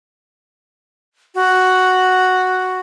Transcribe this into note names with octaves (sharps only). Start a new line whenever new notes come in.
F#4